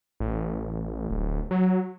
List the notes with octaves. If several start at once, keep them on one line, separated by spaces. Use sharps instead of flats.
A1
D1
F#3